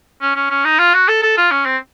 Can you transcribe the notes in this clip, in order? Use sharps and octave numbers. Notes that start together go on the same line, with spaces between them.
C#4
C#4
C#4
D#4
F4
F#4
A4
A4
F4
C#4
C4